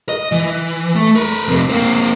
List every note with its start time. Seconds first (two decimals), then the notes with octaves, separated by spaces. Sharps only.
0.09 D#5
0.32 E3
0.95 A3
1.15 A#4 B4
1.48 F2 C3
1.69 A#3 C4